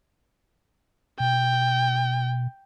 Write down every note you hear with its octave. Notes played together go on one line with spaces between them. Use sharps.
B2 G5